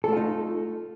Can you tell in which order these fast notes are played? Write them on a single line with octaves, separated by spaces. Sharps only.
A4 A3 F4 D#4